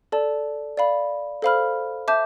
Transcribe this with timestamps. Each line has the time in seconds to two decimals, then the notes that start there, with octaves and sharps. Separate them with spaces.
0.12 A4 D5 A5
0.77 D5 F5 B5
1.42 A4 C5 F5 B5 F6
2.08 E5 A5 D6 G6